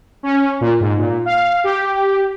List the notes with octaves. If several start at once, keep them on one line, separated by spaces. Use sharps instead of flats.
C#4
A#2
G#2
A#2
F5
G4